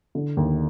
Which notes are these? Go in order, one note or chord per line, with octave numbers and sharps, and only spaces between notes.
D3
D#2